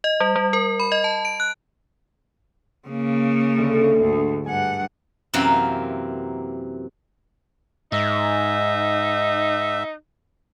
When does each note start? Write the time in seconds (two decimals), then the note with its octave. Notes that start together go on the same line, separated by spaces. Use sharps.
0.04 D#5
0.20 G3
0.36 G3
0.53 A#4
0.80 B5
0.92 D#5
1.04 A5
1.25 D7
1.40 F#6
2.88 C#3 A#3
3.58 D2
4.00 D2 G#2
4.46 G2 F#5 G#5
5.34 F#2 C3 E3 A#3 C4 A#4
7.92 G#2 D#4 E5